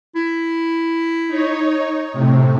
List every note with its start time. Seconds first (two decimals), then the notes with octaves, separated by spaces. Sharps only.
0.16 E4
1.27 D#4 C#5
2.13 A2 C3